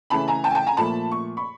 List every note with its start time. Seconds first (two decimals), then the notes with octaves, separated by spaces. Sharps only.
0.10 C#3 E3 A3 A5 B5
0.28 G#5 A#5
0.44 G5 A5
0.51 G#5
0.55 G5 A5
0.67 G#5 A#5
0.77 A#2 F3 A3 A5 B5
1.11 C#6
1.37 B5 C#6